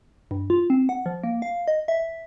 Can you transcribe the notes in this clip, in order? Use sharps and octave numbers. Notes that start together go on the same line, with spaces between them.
G2
F4
C4
F#5
F3
A#3
F5
D#5
E5